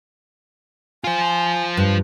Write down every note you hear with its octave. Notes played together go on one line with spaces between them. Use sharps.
F4 C5 G#5
G2